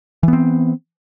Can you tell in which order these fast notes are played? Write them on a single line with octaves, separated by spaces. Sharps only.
E3 B3 C4